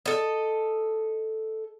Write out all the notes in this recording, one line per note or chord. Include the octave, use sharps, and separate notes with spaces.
A4 D#5